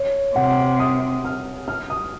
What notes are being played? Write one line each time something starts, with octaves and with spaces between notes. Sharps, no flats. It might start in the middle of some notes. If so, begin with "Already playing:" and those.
Already playing: C#5
C3 F#5
D#6
F6
F6
D#6